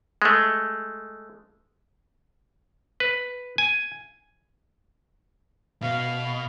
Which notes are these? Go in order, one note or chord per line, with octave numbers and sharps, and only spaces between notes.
G#3 A3
B4
G#5
B2 F5